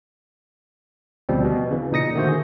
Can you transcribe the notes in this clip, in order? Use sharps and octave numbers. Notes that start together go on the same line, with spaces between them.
D2 B2 F3 G3 C4
B2
C#3 E3
A#2 D#4 D#6 A#6 C#7
D3 D#3 A3 F#4 C5
G#4